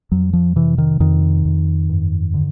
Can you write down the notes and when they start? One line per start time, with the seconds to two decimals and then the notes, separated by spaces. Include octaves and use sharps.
0.12 F2 F#3
0.33 F3
0.56 C3 E3
0.78 D#3
1.00 F2 D#3
1.45 F2
1.89 G2
2.34 D3